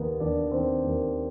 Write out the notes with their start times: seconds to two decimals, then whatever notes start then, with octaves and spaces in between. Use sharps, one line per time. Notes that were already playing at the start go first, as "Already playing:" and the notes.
Already playing: D#2 D#3 B3 D#4
0.20 D#2 D4 D5
0.51 D#3 B3 C4 C5
0.83 D#2